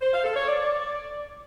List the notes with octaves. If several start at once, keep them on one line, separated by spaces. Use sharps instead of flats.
C5
F5
A4
C#5
D5